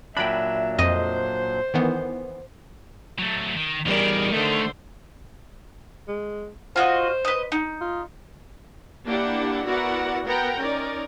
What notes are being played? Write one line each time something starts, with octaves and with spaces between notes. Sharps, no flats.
A#2 F#3 D4 E5 G5 B5
F2 C5 D#5
D#3 E3 B3
F#3 A3
D#3
E2 D#3 G3 G#4 A#4 D5
D3 A3 C5
G#3
F4 F#4 C5 D#5
B4 D#5
D#4
F4
A#3 D4 E4 G4 D5 F#5
B3 E4 F#4 A#4 D5 F#5
B3 A#4 F#5 G5 A#5
C#4 D#4 A#4 D5